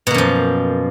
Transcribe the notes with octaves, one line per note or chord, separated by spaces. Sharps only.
F#2 B2 F3 A#3